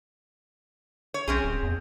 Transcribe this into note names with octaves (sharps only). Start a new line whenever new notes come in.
C#5
B1 C4 C#4 G#4
D1
E2